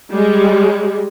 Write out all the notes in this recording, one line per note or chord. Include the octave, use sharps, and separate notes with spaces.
G3 G#3